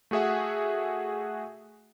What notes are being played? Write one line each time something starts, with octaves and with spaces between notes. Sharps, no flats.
A3 F#4 G#4 E5 F#5